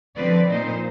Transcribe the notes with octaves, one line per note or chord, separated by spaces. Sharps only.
D3 F3 C4 B4 D5
A#2 D#4 C5